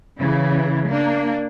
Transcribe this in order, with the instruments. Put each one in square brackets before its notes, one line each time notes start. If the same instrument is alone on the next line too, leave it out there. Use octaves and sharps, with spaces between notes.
[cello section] C#3 E3
A#3 D4